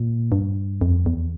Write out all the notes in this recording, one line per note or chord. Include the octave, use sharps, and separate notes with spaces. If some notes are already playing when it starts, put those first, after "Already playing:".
Already playing: A#2
G2
F2
E2